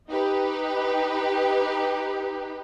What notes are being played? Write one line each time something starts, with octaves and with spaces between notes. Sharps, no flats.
D#4 G4 B4